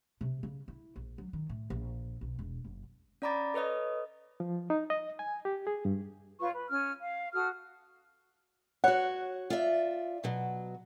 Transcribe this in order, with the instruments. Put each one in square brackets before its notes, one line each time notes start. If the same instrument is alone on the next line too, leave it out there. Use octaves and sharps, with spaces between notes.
[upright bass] C3
C#3
E4
A#1
F#3
D#3
A2
A#1
B1
E1
F#1
[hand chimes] C#4 D5 A#5 B5 D6 A6
A4 B4 C#5 D#5 D#6
[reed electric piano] F3
D#4
D#5
G#5
G4
G#4
G2
[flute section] F4 B4 C#5 C#6
B4
C#4 F6
F5
F#4 A4 D#6 F6
[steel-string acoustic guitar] F#4 C#5 [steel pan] F#5
[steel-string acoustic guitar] F4 D5 E5
B2 F#3